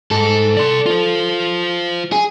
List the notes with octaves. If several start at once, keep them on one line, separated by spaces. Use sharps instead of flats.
G#2 A4
D5 C6
F4 C5
G#4